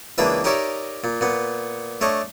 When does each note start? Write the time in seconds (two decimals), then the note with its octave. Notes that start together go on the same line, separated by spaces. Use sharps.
0.18 C#2 E3 A#3 D4 B4 E5
0.44 D#4 G4 A#4 C#5 D5 E5
1.04 A#2
1.21 A#2 B3
2.01 A3 D4 C#5 D#5